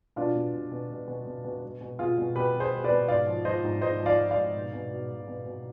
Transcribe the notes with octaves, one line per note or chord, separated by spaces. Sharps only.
B2 D4 F4
B2
B2
B2
B2
B2
B2
B2
B2
B2
B2 F4 G#4
B2
B2 G4 B4
B2
G#4 C5
B2
B4 D5
B2
G#2 D5 F5
F3
F3 C5 D#5
G#2
G#2 C5 D#5
F3
D5 F5
F3
D5 F5
G#2
B2
B2
B2
B2
B2
B2